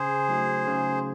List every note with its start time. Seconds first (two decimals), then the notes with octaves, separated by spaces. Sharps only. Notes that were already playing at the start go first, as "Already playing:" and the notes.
Already playing: C#3 G#4 C5
0.29 F#3 A3 D#4 F#4
0.67 C#3